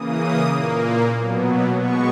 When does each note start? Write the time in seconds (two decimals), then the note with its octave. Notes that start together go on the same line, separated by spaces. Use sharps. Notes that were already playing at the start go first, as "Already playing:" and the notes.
Already playing: C#3 E3 A#3 D#6
0.52 A#2 A#3
1.15 B2 F#3 B3
1.78 B2 G#3 B3 C#6